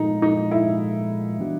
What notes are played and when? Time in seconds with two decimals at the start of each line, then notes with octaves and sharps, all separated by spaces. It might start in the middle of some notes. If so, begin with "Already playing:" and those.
Already playing: A#2 F3 G#3 D#4
0.22 D#4
0.51 E4
1.39 E3 G3 B3 D4 F#4